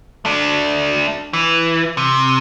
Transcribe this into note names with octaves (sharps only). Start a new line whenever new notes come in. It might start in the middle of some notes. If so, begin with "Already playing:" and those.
A3 D4
E3
C3